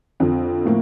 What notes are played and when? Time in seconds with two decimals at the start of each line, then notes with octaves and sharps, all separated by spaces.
0.20 F2 D3 F3
0.66 A2 F3 A#3